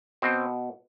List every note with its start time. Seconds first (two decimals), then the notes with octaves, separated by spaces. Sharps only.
0.22 B2 C4